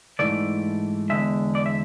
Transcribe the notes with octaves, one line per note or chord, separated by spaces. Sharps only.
G#2 E3 A3 D5
E2 D3 G#3 E5
D5
E5